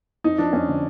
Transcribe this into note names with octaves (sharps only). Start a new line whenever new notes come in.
F2 D#4
F3 D4
F2 C#4
D3